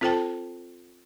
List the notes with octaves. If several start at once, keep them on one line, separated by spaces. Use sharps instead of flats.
C4 F4 A4 C5 G5 A5